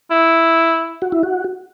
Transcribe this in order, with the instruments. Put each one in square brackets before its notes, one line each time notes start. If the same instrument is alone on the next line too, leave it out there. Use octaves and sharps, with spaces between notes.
[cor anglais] E4
[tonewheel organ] F#4
E4
F#4